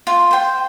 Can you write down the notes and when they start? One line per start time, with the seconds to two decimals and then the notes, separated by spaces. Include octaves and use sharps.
0.07 F4
0.31 C5 G5 C6